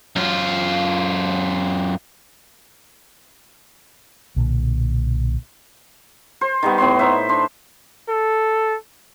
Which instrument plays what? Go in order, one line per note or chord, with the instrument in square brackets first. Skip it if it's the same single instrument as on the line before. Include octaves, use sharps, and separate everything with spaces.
[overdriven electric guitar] F#2 F4
[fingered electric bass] B1 A#2 D3
[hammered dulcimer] C5
D#3 G3 B3
A2 B3 C#5 C6
D#4 C5 E5
D4 C5
[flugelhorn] A4